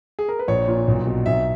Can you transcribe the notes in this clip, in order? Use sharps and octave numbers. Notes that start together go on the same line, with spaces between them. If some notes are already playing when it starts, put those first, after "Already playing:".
G#4
A#4
B4
A#1 C#5
A#2
B1
B2
B1 E5